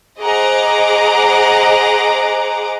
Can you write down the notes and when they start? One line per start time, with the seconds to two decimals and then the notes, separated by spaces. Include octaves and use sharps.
0.20 G#4 C5 D#5 F#5 A#5 D6